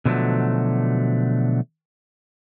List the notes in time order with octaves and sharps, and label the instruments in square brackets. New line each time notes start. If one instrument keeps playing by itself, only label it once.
[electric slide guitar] B2 D3 F3 F#3 A3